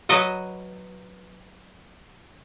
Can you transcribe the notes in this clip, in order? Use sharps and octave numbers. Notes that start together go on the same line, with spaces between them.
F#3 B4 D#5 F#5